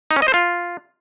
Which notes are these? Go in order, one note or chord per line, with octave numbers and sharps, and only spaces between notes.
D#4
C#4
D#5
C5
F4